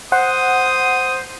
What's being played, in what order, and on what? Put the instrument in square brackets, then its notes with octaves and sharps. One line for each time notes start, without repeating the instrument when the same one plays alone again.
[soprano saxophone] C5 [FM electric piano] F#5 [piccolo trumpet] D#6